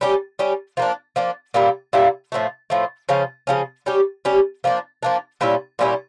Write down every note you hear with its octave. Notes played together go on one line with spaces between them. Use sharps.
G3 C#4 G4
G3 C#4 G4
F3 A#3 D4
F3 A#3 D4
A#2 G3 A#3 E4
A#2 G3 A#3 E4
A2 F3 A3
A2 F3 A3
C#3 F3 C#4
C#3 F3 C#4
G3 C#4 G4
G3 C#4 G4
F3 A#3 D4
F3 A#3 D4
A#2 G3 C#4 E4
A#2 G3 C#4 E4